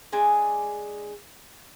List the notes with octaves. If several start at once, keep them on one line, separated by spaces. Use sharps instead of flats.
G#3 D4 G#5